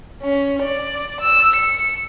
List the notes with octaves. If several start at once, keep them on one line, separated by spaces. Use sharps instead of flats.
C#4
D5
E6
C#7